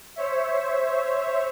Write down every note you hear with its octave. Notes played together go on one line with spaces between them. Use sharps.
C5 C#5 E5